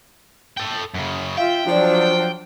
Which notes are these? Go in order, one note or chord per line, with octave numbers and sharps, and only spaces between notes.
A4 G5
F#2 C#3
F4 E5 F5 G5
F3 F#3 D4 F4 D5